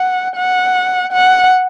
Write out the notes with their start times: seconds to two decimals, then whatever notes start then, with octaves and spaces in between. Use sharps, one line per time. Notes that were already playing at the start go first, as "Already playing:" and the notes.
Already playing: F#5
0.37 F#5
1.13 F#5